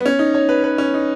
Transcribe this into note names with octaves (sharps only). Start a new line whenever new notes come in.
B3
C#4
D#4
C#5
B4
B4
C#4
D#4